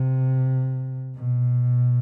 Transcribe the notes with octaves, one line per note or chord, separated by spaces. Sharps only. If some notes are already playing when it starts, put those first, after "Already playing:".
Already playing: C3
B2